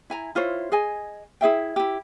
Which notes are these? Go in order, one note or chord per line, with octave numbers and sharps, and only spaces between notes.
E4 G#5 A#5
E4 F4 C5 C#5
G#4 D#5 G#5
E4 G#4 E5 G5
E4 G4